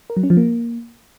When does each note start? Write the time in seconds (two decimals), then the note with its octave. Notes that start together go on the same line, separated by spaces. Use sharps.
0.10 A#4
0.17 F#3
0.23 C#4
0.30 F3
0.37 A#3